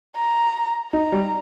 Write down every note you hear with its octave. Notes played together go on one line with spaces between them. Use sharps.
A#5
D#4 A#5
G3